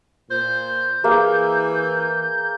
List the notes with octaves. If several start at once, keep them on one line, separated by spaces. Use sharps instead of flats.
A#2 C5 G6
E3 A#3 G#4 F5